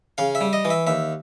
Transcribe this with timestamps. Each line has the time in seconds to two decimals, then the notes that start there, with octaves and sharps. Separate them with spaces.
0.18 C#3 F5
0.35 E5
0.41 G3
0.53 D#5
0.65 E3
0.70 E5
0.87 D#2 E5